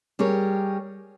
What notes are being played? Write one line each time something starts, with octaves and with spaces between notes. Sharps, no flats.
G3 G4 G#4 A#4 C#5